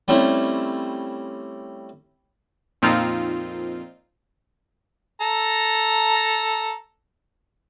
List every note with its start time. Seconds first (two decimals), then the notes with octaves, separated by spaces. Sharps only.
0.08 G3 A3 C4 C#4 E4
2.82 F2 A#2 F3 C4 D#4 F4
5.21 A4 A#5